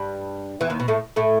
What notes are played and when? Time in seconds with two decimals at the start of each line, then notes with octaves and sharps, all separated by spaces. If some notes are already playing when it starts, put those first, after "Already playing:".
Already playing: G2 G3
0.61 E2 E3
0.70 D#2 D#3
0.80 B2
0.88 A2 A3
1.16 A2 A3